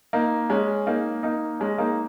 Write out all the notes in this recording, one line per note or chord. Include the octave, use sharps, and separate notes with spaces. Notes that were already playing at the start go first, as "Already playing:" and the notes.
A#3 D#4
G#3 C#4
A#3 D#4
A#3 D#4
G#3 C#4
A#3 D#4